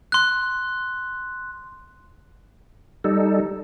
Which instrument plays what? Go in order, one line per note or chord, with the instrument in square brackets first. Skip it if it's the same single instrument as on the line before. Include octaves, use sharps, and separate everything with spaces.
[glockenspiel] C6 F#6
[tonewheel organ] G3 D#4 A4